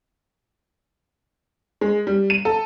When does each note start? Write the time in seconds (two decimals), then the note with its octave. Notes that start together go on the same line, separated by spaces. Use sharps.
1.81 G#3
2.07 G3
2.30 D#7
2.45 A4